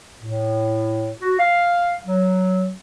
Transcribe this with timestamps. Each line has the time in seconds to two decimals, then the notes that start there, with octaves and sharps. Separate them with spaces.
0.20 A2
1.21 F#4
1.39 F5
2.06 F#3